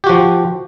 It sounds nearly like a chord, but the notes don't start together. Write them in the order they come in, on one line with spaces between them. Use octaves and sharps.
G4 F#4 F3